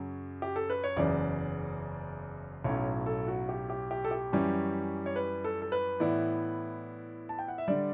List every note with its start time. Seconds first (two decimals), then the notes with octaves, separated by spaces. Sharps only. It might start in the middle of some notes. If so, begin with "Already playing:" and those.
Already playing: F#2 C#3 F#3 C#4
0.42 G4
0.56 A4
0.70 B4
0.84 C#5
0.96 F#1 E2 C#3 D5
2.64 B1 A2 F#3 C#4 C#5
3.06 A4
3.28 F#4
3.49 G4
3.70 G4
3.91 G4
4.05 A4
4.11 G4
4.33 F#2 E3 G3 C#4
5.06 C#5
5.16 B4
5.44 A4
5.62 A4
5.72 B4
6.00 A2 E3 B3 E4 D5
7.29 A5
7.39 G5
7.48 F#5
7.58 E5
7.68 D3 G3 D5